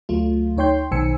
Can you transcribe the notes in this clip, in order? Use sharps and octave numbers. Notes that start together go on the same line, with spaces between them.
D2 F#3 A3 F4
D2 D#4 C#5 G5 C6 G6
B1 D#3 C5 G#5 E6 C#7